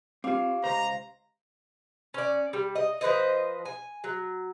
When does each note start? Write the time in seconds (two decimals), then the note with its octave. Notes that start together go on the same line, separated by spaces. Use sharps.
0.24 C4 F4 G4 F5 D6
0.64 C#2 C5 A#5
2.14 C#4 D5
2.53 G3
2.75 D#5
3.01 F3 B4 C5 D#5
3.65 G#5
4.04 F#3